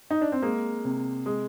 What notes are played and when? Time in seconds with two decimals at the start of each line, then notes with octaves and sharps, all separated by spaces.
0.11 D#4
0.21 D4
0.32 C4
0.42 G#3 A#3
0.85 C3
1.26 G#3